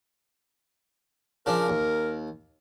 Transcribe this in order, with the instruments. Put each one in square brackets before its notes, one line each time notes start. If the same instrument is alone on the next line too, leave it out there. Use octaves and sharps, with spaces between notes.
[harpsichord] C#3 F3 D4 [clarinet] A#4
[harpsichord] D#2